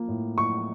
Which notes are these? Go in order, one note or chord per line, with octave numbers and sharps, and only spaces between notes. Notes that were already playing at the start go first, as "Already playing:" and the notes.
Already playing: F3 A#3
A2
A2 C#6